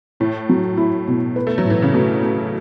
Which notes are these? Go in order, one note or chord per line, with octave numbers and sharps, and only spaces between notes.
A2 E4
F#3
E4
B2
B4
A3
F#3
A2
E3
C#3
B2 A3
A3